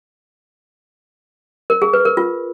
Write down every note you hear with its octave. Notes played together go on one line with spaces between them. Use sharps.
A#4
G#4
B4
A#4
F4